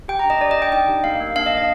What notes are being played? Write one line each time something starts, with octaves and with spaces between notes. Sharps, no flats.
G4 G5
A#5
D4
D#5
D4 D5
D#5
D4
G5
D#4 G5
G4
A#3 F5
A#3
D4 F5
D#5
D4
D#5